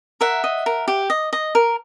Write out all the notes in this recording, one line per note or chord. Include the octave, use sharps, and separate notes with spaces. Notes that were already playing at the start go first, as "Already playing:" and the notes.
A#4 E5 F#5
D#5
A#4
G4
D#5
D#5
A#4